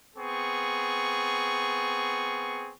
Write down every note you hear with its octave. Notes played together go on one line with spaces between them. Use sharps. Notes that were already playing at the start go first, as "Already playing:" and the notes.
B3 C4 G#4 C#6